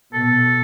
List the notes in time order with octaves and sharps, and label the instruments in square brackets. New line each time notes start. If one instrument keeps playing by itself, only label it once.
[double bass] B2 [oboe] A4